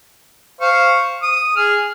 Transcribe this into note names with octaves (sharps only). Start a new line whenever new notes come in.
C5 F5 C#6
D#6
G#4 F6